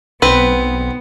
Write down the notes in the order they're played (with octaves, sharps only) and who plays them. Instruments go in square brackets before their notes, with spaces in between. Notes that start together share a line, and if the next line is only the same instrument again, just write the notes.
[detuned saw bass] B1 [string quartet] B3 [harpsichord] C4 [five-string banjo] B4